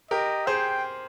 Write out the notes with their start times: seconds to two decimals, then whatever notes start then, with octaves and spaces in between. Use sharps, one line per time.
0.11 G4 A#4 D#5
0.47 G#4 C5 G5